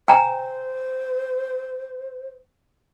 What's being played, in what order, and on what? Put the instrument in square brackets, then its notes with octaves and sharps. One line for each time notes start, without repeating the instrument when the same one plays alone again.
[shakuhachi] C5 [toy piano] G5 G#5 A#5